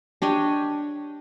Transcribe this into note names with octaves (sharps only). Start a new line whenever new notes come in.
D4 G4 C#5 D#5